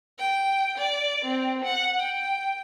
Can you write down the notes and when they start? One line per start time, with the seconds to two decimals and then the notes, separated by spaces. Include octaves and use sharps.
0.18 G5
0.78 D5
1.25 C4
1.64 F#5
2.00 G5